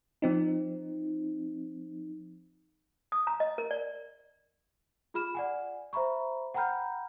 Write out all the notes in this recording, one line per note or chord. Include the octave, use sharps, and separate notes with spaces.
F3 C4 D#4
D#6
A#5
D#5
A#4
D5
F4 G#4 B5 F6 E7
D5 F#5 G#5
C5 E5 A#5 B5 C#6
F#5 G5 A#5 B5 F6 G6